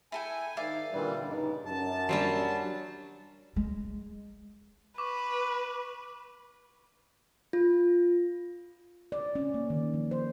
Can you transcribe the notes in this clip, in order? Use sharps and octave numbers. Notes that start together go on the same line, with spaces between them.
E4 A4 G5 G#5
G#2 D#3 D5 E5 F5
A#2 D3 E3 G3
G2 C#3 C#4 D#4
F#2 A5
F#3 G3 D4 C5 C#5 B5
G#3
B4 C#6 D6
F4
D5
C#4
A#3
D#3
F3
C5